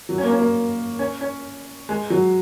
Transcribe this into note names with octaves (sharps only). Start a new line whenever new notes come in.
F#3
C#4
A#3
C#4
A#3
C#4
C#4
G#3
F#3